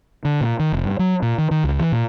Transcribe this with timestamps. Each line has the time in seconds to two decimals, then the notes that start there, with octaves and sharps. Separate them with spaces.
0.25 D3
0.41 A#2
0.59 D#3
0.73 F1
0.85 G2
0.99 F#3
1.22 A#2
1.38 D#3
1.51 D#3
1.64 C#2
1.79 E3
1.92 A#2